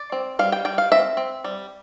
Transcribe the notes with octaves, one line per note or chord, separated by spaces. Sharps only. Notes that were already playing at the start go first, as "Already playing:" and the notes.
Already playing: D5
C4
G3 F5
G5
G3 G5
F5
C4 E5
C4
G3